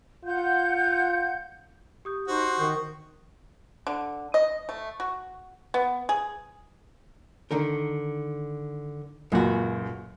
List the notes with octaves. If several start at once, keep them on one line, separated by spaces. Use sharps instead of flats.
F4 F#5 G6
G4 D#6 G6
D#4 F#4 C5
D#3 C#6 D#6 G6
D3
D#5
A3
F#4
B3
G#4
D3 D#3 A#4
C#2 F#2 A#2 F#4